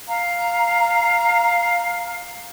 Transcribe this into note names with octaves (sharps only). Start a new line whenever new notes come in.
F5 A#5